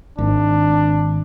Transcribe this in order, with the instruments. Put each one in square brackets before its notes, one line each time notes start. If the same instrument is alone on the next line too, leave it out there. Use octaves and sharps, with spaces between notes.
[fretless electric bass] G#1 [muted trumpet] D4